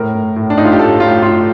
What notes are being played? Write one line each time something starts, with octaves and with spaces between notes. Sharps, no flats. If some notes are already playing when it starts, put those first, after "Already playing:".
Already playing: A2 A#4
A2
A2
D4
A2 D#4
F4
G4
A2 A4
A2 F4
A2 F4